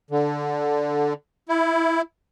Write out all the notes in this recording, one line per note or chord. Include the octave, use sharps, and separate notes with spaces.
D3
E4